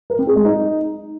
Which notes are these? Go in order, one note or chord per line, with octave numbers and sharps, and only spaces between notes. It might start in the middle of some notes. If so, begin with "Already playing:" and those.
A#4
C4
G#4
G#3
D#4